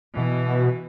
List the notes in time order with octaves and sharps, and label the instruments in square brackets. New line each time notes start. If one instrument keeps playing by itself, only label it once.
[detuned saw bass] B2 [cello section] E3